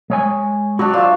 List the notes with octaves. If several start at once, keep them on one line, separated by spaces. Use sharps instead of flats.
G#3 C#5 G#5
F#3 D4 F#4
F4 C5 D5 E5